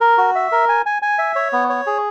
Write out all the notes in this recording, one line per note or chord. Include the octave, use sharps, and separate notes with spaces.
A#4
F#4
E5
A#4
G#5
G#5
G#5
E5
C#5
B3
C#5
G#4